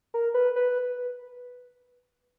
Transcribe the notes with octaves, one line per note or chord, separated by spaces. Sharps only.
A#4
B4
B4